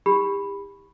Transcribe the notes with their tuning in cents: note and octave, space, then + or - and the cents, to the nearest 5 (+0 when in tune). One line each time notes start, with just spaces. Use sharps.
E4 -25 G4 +35 B5 +0